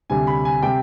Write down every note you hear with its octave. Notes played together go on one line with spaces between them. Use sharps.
D2 C3 G3 G#5
B5
G#5
C3 G3 G5